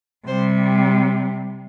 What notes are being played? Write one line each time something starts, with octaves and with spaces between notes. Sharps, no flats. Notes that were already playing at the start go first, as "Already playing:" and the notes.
C3 G3 C5